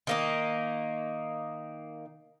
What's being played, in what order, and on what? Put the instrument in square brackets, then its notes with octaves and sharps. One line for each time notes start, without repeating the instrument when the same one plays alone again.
[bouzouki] D#3 A#3 D#4